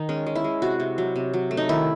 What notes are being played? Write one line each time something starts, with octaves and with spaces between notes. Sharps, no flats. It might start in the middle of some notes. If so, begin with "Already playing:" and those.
Already playing: D#3 D#4
G#3 C#4
G#3
E4
G#3
C3 F#4
C3
F#3
C3
F#3
A3
D#4
D#3 E4